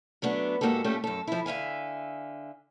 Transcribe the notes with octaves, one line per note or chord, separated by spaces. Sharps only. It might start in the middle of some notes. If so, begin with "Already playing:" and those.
F#3 A3 B3 D4
G#2 A#3 F#4 G4 A4
A#2 G3 A3 C#4 G4 A4
F#2 A4
F3 E4
D3 E5 F5 G#5